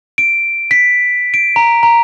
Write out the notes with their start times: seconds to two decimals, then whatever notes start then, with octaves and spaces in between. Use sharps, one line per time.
0.18 D7
0.71 B6
1.34 D7
1.56 A#5
1.83 A#5